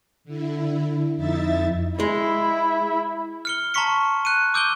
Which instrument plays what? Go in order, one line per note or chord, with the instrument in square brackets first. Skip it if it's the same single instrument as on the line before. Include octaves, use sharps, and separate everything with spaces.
[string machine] D3 E4
F2 D#4 E4 E5 A6
[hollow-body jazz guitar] G#3 [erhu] E4
[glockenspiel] F6 C#7 G7
A5 A#5 C6 C#6 B6 C#7
F#6 C#7 D#7
D6 E6 G6 D7 D#7 G7